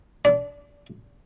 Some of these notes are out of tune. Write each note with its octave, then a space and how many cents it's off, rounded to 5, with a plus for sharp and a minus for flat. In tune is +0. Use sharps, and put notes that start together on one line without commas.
D4 -25